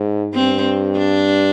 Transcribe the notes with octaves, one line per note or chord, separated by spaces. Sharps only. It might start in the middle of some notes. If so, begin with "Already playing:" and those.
Already playing: G#2
G2 C4
D4